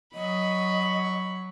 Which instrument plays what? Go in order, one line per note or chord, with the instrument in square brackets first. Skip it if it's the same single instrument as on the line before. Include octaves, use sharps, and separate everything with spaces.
[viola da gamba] F#3 [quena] D#5 [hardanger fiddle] B5 C#6